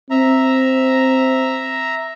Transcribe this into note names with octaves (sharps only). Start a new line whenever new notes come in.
C4 E5 A#5